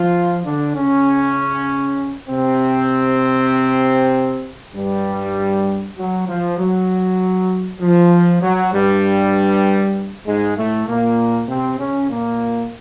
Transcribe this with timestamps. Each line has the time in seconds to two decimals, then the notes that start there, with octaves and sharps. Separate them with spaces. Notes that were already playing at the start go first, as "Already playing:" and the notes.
Already playing: F3 F4
0.44 D3 D4
0.76 C#3 C#4
2.28 C3 C4
4.74 G2 G3
5.97 F#3
6.28 F3
6.58 F#3
7.81 F3
8.42 F#3
8.72 G2 G3
10.26 G#2 G#3
10.56 A2 A3
10.87 A#2 A#3
11.48 C3 C4
11.79 C#3 C#4
12.09 A#2 A#3